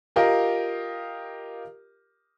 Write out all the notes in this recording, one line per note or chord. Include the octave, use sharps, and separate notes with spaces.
F4 G4 A#4 D#5 F5